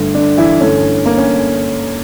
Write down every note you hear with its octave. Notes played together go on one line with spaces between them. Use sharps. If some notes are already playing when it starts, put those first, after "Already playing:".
Already playing: G1 G2 D3 A3
D3 D4
E3 E4
G1 G2 D3 A3 C#4
A#3
C#4